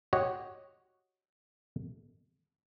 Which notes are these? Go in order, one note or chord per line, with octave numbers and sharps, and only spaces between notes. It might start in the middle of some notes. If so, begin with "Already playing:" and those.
F#4 G4 C#5 D#5